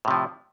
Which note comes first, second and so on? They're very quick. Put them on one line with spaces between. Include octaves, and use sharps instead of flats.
A2 C3 F3